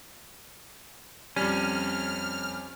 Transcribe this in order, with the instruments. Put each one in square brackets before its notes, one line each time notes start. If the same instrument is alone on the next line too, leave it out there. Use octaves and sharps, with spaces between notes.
[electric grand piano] F2 G3 [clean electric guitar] C#4 [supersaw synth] F6